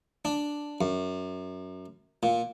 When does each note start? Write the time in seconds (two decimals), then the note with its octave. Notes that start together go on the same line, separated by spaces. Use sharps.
0.25 D4
0.81 F#2
2.23 A#2